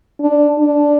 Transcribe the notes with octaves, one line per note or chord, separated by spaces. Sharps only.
D4
D4